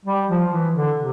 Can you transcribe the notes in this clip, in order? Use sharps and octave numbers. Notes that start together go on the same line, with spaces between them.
G3
F3
E3
D3
C3